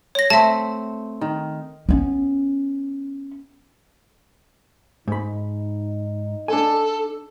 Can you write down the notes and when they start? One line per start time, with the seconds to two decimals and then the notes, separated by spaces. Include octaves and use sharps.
0.15 C#5 A#6
0.30 A3 C4 E5 A5
1.21 D#3
1.89 B3 C#4
5.08 G#2 D#4 B5
6.48 D4 A4 G#5